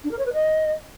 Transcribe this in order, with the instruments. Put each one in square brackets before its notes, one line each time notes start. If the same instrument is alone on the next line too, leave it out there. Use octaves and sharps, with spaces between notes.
[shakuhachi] D4
A#4
C#5
B4
D#5